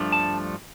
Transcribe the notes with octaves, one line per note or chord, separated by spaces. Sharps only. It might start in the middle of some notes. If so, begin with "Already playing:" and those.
Already playing: G2 F3 A3 D4
A5